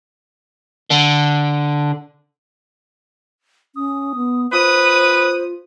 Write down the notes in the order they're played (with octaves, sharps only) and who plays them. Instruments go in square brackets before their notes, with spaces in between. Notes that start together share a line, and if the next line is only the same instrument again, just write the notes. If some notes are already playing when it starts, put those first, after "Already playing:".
[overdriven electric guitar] D3
[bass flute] C#4 [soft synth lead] D#6
[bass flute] B3
[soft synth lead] F4 [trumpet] B4 [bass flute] C5 [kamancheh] D#6